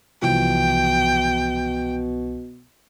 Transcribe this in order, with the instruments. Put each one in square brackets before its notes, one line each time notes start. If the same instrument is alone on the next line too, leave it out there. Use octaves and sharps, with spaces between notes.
[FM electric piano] C2 E3 F3 [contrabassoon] B2 [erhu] G5